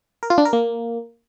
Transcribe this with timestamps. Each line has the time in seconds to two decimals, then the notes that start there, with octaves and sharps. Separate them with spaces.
0.23 A#4
0.30 F4
0.38 D4
0.45 A#4
0.53 A#3